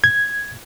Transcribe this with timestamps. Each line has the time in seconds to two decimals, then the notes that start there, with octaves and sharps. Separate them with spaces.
0.04 G#6